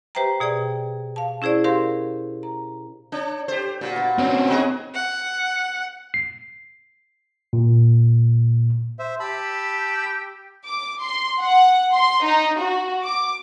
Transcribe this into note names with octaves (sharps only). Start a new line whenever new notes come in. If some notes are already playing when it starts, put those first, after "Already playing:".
G4 B4 C5 E5 G5 A#5
B2 G#4 D5 G5
F5 A5
C#4 E4 G#4 C5 D5
G4 A#4 C5 F5 C6
A#5
D4 C#5
G4 A4 C5
A#2 D4 F#4 A5
B3 F#4
B2 C4 C#4 E5
D#4 F#4 G#4 C6
F#5
C7
A#2
C5 E5
G4 A5 B5 E6
D6
C6
F#5
C6
D#4
F#4
D6